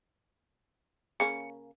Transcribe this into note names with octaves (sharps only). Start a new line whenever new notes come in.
C#3 A#3 C#4 C#7